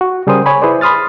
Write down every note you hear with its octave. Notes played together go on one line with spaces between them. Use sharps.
F#4
C#3 G3 G#4 A#4 C5 D#6
C#5 G#5 B5
E4 G#4 B4 C5 D5
B5 C6 D#6 F6 A6